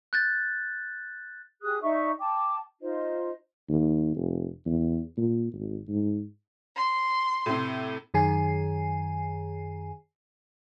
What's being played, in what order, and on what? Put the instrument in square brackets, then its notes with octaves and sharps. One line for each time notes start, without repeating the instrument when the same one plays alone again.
[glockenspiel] F#6 G6 A6
[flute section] G4 G#4 D#6 F#6
D#4 D5 E5 C#6
G5 A5 D6
D#4 F4 C5 D#5
[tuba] D#2
F1
E2
A#2
G#1
G#2
[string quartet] C6
[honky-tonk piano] A2 C3
[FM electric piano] F#2 D#3 G#4 G#5 C7